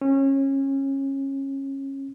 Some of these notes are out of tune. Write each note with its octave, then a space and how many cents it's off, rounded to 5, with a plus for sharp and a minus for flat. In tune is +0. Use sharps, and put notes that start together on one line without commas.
C#4 -25